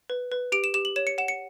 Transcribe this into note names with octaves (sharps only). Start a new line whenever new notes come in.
B4
B4
G4 D7
E7
G4 E7
F#7
C#5 E7
C#7
F#5 E7
C#7